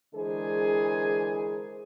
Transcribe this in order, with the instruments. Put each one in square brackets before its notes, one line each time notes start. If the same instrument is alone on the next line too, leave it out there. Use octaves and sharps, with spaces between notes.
[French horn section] D3 E3 G#3 G#4 A#4 C5